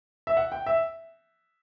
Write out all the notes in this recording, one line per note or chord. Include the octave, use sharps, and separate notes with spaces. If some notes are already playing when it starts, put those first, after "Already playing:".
E5
F#5
G5
E5